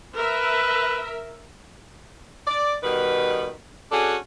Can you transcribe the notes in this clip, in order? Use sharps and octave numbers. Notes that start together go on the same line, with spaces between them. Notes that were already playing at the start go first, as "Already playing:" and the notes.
A#4 B4 E5
D5
B2 D#3 G3 B4
C#4 D4 F#4 G#4 A4